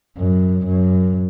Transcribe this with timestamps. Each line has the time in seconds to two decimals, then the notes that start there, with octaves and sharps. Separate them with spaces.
0.18 F#2
0.66 F#2